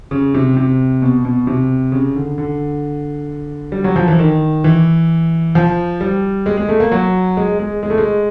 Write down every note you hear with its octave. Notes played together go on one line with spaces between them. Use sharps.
C#3
C3
C3
B2
B2
C3
C#3
D3
D3
G3
F#3
F3
E3
D#3
E3
F3
G3
G#3
G#3
A3
A#3
F#3
G#3
G#3
G#3
A3
G#3